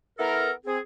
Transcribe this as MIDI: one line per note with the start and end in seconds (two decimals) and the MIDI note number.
0.19 0.51 59
0.19 0.51 64
0.19 0.51 69
0.19 0.51 70
0.65 0.78 60
0.65 0.78 68